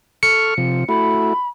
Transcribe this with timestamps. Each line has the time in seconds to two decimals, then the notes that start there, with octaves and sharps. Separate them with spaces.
0.23 A4 C#6 F6 C#7
0.58 C3 F3
0.89 A3 E4 F#4 B5